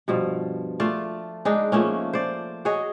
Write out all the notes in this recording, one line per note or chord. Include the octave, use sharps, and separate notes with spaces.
G2 B2 F3
A3 F4 D5
G#3 D4 D#4
F3 A3 A#3 C#4
C5 D5
F#4 G#4 C#5 D#5